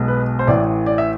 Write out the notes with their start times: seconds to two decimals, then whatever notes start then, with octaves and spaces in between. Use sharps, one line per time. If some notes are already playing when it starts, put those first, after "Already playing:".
Already playing: B1 B2 G#3
0.08 B4
0.39 C5
0.47 A1 A2 E3 D5
0.86 D5
0.98 E5